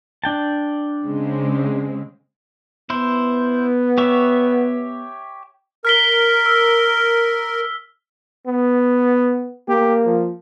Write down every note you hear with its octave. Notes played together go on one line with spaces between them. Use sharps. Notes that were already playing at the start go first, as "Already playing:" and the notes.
D4 G5 A5
C#3 G#3 C4
B3 E4 C5
G4 C#5 E5
A#4 F6 B6 G7
E6
B3
A#3 G4
F3